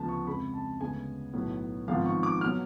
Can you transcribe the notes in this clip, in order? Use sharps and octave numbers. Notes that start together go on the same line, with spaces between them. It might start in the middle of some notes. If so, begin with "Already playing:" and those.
Already playing: D2 C#3 F3 B3 A5
C#6
F2 C#3 G#3 B5
A5
D2 C#3 G#3 B3 G#5
B1 A2 F#3 B3
G#1 G#2 F3 B3 F5
C#6
D6
B2 F#3 B3 F6